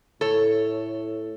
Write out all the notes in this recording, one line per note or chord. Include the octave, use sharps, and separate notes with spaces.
A2 A4 C#5